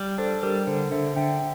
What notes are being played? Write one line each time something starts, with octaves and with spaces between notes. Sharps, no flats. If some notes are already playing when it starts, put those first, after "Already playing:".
Already playing: G3
D4 A4 C5
G3 G4 A#4
D3 A4 C5
D3 C5 E5
D3 E5 G5